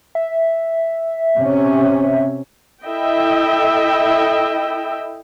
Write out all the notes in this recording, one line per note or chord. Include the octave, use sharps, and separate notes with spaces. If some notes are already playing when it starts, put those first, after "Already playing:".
E5
C3 C#4
E4 A4 D#5 E5 G5